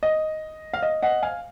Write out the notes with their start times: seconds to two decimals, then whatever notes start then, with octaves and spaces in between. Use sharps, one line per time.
0.03 D#5
0.73 F5
0.83 D#5
1.03 D#5 F#5
1.23 F5 G#5